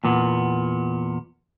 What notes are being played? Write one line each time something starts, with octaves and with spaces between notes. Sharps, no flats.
E2 A#2 B3